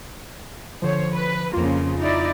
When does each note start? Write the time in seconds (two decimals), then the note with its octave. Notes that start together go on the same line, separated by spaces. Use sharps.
0.82 D3 F3 C5 C#5
1.14 B4
1.53 F2 C#3 F3 A#3 F4
1.99 D#4 E4 D5